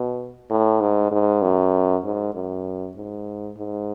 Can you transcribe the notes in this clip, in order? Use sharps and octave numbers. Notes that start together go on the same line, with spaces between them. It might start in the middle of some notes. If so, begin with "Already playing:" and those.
Already playing: B2
A2
G#2
G#2
F#2
G#2
F#2
G#2
G#2